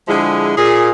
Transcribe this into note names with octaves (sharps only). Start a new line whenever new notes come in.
D3 F3 G#3 E4 G#4
A#2 G#4